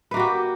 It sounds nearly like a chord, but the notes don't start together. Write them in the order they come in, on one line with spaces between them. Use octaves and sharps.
B4 A#3 F#4 G4